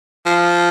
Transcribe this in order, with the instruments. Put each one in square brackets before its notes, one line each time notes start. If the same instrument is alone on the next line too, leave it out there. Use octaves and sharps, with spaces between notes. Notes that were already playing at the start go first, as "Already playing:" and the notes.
[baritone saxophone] F3